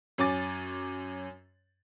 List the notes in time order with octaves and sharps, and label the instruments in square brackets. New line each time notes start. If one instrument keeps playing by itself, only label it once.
[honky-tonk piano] F#2 C#5 G#5 D6 A6